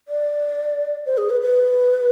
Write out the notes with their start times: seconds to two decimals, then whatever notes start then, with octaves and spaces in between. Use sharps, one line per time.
0.08 D5
1.06 C5
1.18 G#4
1.30 B4
1.41 B4